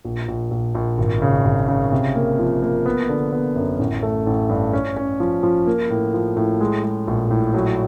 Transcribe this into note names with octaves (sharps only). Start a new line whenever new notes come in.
A#1
A#1
A#1
A#1
G#1
C#3
G#1
C#3
C3
A#3
F3
A#3
B3
D3
B3
F#2
A1
A3
A1
G2
C#4
C#4
F3
F3
A#3
A2
F3
A2
G#3
G#3
A#1
A2
F#3